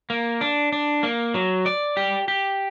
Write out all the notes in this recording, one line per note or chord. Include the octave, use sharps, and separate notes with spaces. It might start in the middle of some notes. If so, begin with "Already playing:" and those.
A#3
D4
D4
A#3
F#3
D5
G4
G4